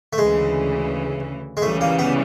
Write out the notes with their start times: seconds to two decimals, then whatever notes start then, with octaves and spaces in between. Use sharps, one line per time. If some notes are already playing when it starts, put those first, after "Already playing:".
0.13 A3
0.18 D2 C#3 E3 G#3
1.57 G#3
1.62 C#2 C#3 E3 G3 A3
1.81 A#3
1.99 B3